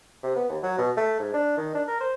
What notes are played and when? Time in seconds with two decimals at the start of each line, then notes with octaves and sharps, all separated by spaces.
0.23 C3
0.36 B3
0.49 D#2
0.63 F#3
0.78 B2
0.97 A3
1.19 G#2
1.33 D4
1.57 D#3
1.74 D4
1.87 A#4
2.00 C5